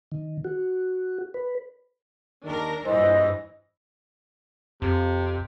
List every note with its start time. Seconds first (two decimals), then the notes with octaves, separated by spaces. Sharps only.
0.12 D#3
0.44 F#4
1.34 B4
2.44 D#2 D#3 D4 A#4
2.86 A#1 G2 E3 C5 D#5
4.82 F2 C3